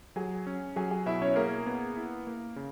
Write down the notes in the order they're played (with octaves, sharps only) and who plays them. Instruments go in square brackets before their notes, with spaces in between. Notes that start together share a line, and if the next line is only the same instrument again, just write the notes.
[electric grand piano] F#3 [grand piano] G#4 G#5
[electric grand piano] C#4
[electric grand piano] F#3 [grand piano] G#4 G#5
[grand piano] G#4 G#5
[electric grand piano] B2 [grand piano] E4 E5
[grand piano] C#4 C#5
[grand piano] A#3 A#4 [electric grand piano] G#4
[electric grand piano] B3
E4
A#3
C#3